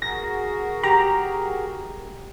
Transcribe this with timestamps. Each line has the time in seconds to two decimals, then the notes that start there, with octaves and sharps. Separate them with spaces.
0.02 F#4 G#4 A#4 A#6
0.83 G4 A#5